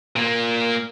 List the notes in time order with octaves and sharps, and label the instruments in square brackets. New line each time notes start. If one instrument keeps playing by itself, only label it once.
[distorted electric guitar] A#2 A#3